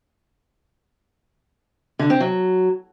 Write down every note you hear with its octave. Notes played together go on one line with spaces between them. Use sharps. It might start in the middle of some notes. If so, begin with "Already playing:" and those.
D3
C4
F#3